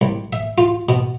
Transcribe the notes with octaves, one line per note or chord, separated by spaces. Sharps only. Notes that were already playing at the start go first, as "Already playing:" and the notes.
C2
E5
F4
B2